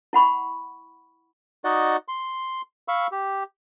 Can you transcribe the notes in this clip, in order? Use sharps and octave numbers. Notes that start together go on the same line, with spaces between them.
E4 F#5 B5 C#6
D#4 F#4 D5 D#5 F#5
C6
F5 B5 C#6 E6
G4